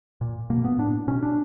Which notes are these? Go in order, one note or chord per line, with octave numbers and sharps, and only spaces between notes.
A#2
B2 A#3
B3
A2 D4
B2 C#4
D4